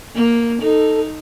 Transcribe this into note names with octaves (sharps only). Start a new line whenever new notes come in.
A#3
D#4 A4